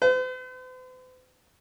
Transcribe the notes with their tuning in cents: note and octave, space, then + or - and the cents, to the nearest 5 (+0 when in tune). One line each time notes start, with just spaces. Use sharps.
C5 -45